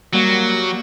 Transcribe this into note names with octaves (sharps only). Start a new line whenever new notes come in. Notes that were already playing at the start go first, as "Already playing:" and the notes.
F#3 G3 A#3 F#4